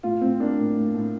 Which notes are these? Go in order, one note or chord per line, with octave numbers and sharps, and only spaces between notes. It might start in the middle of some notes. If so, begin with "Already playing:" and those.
A2 F4
A2 C4
A#3 D4
A2
A2
A2